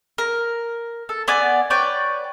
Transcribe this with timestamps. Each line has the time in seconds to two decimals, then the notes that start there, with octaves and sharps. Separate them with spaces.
0.18 A#4
1.09 A4
1.28 B3 D5 G#5
1.70 B4 C#5 D5 G5